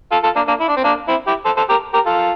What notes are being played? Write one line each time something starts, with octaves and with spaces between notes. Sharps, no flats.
F4 A4
F4 A4
A#3 D4
A#3 D4
E4
D4
C4
A#3 D4
C4 E4
E4 G4
A4 C5
A4 C5
G4 A#4
G4 A#4
F4 A4